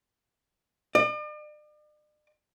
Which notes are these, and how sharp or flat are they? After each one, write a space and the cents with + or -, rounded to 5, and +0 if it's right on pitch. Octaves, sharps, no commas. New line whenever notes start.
D5 +45